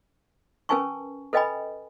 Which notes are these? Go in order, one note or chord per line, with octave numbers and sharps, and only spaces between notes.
C#4 A#4 B4 G#5 A5 C#6
A4 B4 D#5 G5 G#5 B5